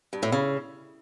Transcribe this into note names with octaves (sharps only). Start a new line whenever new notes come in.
G2
A2
C#3